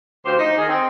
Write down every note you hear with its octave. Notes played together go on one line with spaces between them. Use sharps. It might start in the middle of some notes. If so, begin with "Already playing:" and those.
D2 F3 G4 C5
D#4
D#3 G#4
C4